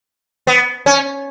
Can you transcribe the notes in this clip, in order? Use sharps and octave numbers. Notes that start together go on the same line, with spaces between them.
B3
C#4